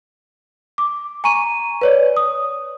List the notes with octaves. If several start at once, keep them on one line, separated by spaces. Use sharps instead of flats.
D6
G#5 A#5 C#6 D#7
B4 C#5 D5
D#6